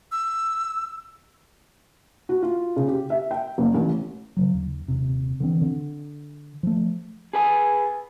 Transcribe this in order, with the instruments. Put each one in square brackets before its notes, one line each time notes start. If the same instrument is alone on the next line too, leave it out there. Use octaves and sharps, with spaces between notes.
[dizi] E6
[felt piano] F#4
F4
C#3
G4
E5
G5
F#1
A1
[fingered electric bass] C#3 E3 F#3
D#2
D#1 G#1 C3
D3 E3 C4
D3
F3 A3
[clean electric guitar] G#4 B4 G#5